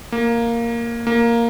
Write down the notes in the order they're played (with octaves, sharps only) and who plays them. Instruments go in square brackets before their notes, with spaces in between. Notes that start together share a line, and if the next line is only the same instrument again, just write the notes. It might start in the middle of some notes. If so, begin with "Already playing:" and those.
[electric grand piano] A#3
A#3